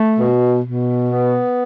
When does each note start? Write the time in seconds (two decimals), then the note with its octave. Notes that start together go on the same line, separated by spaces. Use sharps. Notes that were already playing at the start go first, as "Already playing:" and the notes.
Already playing: A3
0.19 B2
0.64 B2
1.10 B3